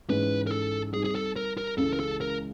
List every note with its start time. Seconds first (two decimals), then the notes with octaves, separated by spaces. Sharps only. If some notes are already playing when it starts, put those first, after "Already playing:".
0.10 G#2 E3 G#3 C#4 B4
0.47 A#4
0.51 A4
0.93 G3 C4 D#4 G#4
1.04 G#4
1.15 A4
1.36 A#4
1.58 A#4
1.78 C#2 C#3 E3 G#3 A4
1.93 A#4
2.00 A4
2.21 A#4